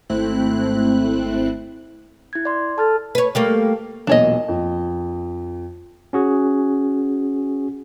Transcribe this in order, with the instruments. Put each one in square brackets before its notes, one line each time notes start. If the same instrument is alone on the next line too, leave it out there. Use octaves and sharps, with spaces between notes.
[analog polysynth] G#1 A3 C4 E4 F#6
[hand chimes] E4 G#6
D5 C6
[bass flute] A4 [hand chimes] A5 F6 A6
[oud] B4 C#5
G3 A3 A#3
[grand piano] E1 B1 A#2 [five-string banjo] D4 C#5 D#5
[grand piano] F2
[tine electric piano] C#4 F#4 G#4